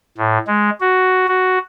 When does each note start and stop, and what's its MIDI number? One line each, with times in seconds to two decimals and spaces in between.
0.17 0.38 45
0.48 0.70 56
0.80 1.27 66
1.28 1.58 66